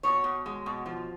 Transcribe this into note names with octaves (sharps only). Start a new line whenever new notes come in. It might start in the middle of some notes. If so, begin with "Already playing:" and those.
B2 C#5
B2
G#3
B2
F3